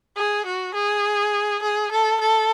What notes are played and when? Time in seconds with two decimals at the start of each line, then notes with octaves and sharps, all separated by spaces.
0.17 G#4
0.47 F#4
0.75 G#4
1.63 G#4
1.92 A4
2.21 A4